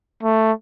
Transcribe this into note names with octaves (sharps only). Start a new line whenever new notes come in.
A3